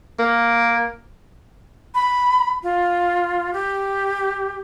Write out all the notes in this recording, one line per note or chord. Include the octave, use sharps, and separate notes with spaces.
A#3
B5
F4
G4